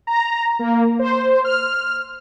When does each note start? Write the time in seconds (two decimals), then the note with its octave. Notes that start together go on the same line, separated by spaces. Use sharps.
0.07 A#5
0.59 A#3
0.99 C5
1.45 F6